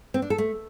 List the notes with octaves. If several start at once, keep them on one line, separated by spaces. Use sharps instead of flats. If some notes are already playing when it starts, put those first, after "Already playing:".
C4
D4
A4
A3